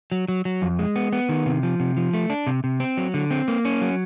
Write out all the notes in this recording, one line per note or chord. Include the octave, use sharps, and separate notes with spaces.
F#3
F#3
F#3
F2
G#3
B3
B3
D#3
C3
F3
C3
F3
A3
D4
C3
C3
C4
F#3
D3
C4
A#3
C#4
F#3